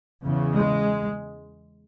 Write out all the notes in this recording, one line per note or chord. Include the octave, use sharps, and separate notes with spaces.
E2 C#3
G#3